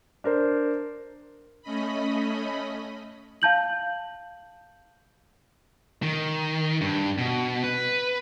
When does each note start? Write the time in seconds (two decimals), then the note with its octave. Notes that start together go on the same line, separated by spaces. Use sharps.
0.24 D4 A#4 C5
1.62 A3 C#4 D#5 B5
3.42 F5 A5 G6 F#7
6.03 D#3
6.81 G2
7.18 B2
7.64 B4